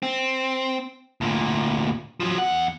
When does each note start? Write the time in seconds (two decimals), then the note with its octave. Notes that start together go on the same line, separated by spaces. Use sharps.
0.03 C4
1.21 D2 A#2
2.20 F3 F#3
2.38 E2 F#5